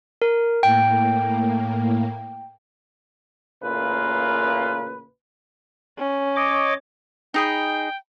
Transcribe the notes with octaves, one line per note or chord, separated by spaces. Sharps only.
A#4
A2 A#3 G5
A1 A#2 C#3 A#3 F4 B4
C#4
C#5 D#5 D6
D#4 G#4 G5 B5